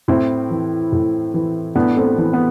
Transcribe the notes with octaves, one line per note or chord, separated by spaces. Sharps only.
A2 C4 E4
E3
A2
E3
A2 B3 D4
A3 C4
E3
B3